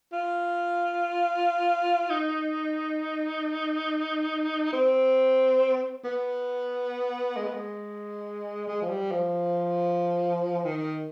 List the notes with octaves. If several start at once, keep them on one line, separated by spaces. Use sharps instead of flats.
F4
D#4
C4
B3
G#3
B3
G#3
G#3
F3
G3
F3
D#3